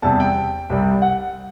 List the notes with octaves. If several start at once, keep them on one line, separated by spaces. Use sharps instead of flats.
E2 C3 G3 A5
G5
C2 C3 G3
F#5